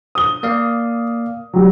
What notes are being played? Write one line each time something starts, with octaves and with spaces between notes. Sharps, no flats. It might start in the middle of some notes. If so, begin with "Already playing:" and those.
D#6 G7
A#3 D5 F5
F#3 G3